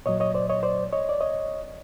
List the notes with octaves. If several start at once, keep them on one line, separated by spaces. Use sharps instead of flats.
A#2 F#3 C#5 D#5
C#5 D#5
C5 D5
C#5 D#5
C5 D5
C#5 D#5
D5
C#5 D#5